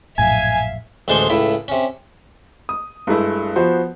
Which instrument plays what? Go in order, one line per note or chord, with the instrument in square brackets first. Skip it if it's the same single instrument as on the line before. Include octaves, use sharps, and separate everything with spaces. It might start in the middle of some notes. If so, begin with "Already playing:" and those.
[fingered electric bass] A#1 F#2 A2 [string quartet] E5 F5 [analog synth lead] G#5
[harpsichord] A1 D2 G#3 D4 C5 C#6
C#2 A2 E4
C3 C#4
[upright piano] D#6
G2 G#3 A3 E4
F3 B3 F#4 C5